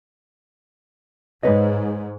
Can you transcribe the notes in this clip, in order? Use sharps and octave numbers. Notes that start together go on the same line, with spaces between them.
G#2 B4 C#5 D#5